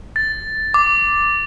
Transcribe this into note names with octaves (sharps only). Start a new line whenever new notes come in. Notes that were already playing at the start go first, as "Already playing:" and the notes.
A6
D6